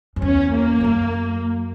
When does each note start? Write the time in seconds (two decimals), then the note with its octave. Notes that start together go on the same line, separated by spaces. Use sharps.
0.16 F#2
0.22 E2 C#4
0.53 A#3
0.81 E2
0.84 F#2